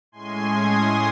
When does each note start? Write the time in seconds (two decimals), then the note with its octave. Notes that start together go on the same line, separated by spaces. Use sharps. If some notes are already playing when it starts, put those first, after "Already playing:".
0.12 A2 G#3 C#4 G#5 C6
0.50 C6 D#6